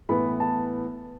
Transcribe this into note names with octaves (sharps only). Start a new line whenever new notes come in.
A2 E3 B3 B5
A5